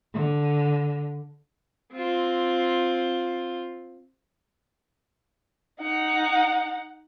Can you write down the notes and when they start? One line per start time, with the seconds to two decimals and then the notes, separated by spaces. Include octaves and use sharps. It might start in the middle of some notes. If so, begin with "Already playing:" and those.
0.13 D3
1.93 C4 F4
5.81 D#4 F#5